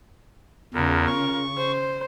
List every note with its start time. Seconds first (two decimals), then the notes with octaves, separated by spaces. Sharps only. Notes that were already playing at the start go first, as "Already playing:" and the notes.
0.74 E2 C#3 F4 A#4
1.07 C#6
1.57 C5